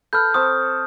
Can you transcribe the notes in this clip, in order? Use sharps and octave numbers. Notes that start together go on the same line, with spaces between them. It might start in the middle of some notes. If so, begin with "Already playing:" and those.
A4 B4 F6 G6
C4 A4 C#6 D#6